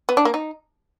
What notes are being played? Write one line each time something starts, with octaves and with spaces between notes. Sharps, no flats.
B3
D4
A#3
D#4